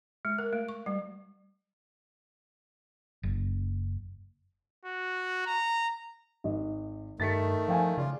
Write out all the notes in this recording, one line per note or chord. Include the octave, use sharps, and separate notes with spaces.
G#3
A#4
A3
C#6
G3
F#1
F#4
A#5
G#1 D#5
G2 D#3 A3 A6 B6 C#7
F3 F5 G5 G#5
C#3 F4 D5